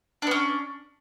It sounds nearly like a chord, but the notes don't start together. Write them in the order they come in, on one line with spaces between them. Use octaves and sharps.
D4 B3 C#4